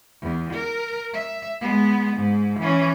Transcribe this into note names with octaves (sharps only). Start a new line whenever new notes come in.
E2
A#4
E5
G#3 B3
G#2
E3 C#4